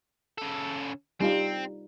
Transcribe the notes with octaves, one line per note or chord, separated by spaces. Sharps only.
C#3 A4
G3 C4 D#4 F4